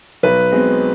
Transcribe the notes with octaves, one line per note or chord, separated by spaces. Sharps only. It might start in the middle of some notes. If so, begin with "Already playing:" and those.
B1 B4
B2 G#3 C4